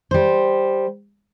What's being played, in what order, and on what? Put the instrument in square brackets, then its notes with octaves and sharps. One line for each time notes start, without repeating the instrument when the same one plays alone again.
[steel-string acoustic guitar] G3 C5